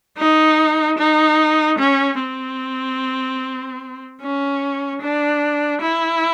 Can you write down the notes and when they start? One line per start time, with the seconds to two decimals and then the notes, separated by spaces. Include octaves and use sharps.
0.17 D#4
0.98 D#4
1.79 C#4
2.20 C4
4.21 C#4
5.01 D4
5.82 E4